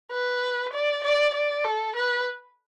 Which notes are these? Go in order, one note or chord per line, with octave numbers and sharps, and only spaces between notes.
B4
D5
D5
D5
A4
B4